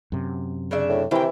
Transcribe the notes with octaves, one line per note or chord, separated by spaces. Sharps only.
F#2 C3
C#3 D4 E5
A2
C3 D#3 E3 E4 G5